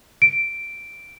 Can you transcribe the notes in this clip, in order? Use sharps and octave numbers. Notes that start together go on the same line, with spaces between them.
D7